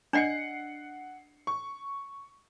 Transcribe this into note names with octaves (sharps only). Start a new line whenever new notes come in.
D4 D5 D#5 F#5 C7 C#7
C#6